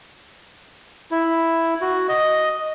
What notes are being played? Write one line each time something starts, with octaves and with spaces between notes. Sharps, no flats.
E4
F#4
D#5